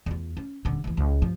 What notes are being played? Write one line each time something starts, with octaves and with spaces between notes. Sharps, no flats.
E2 F4
C#4
D#1 D3
D#2 E3
C#2
G2 F3